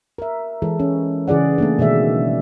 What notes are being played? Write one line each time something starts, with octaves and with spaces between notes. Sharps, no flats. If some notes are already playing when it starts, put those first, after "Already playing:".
A#4 E5
E3 G#3 A4
C#4
C#3 E3 G#4 D5 F#5
A3 A#3 D4
B2 D#3 G#3 E5